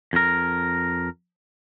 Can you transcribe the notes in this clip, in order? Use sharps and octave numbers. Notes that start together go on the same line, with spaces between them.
F2 A#4